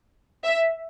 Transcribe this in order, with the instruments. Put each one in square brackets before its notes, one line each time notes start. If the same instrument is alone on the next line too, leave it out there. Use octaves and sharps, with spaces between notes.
[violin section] E5